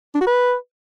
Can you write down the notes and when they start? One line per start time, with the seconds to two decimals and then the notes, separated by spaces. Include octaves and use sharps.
0.15 D4
0.21 F#4
0.27 B4